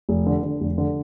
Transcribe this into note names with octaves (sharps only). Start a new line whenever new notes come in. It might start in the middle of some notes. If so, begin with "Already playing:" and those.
F1
D3
D3
F1
D3